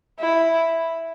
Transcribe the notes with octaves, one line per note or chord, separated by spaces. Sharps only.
E4